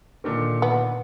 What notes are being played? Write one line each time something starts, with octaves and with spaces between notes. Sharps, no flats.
A#2 D3 D#3
B3